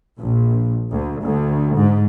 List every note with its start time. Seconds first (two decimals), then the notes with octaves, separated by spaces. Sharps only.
0.18 A#1
0.91 D2
1.22 D2
1.76 G#2